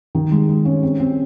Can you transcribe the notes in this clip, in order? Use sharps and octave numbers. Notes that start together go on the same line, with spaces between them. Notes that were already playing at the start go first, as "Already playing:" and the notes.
D#3
G#3
G#3
C#4
C4
C4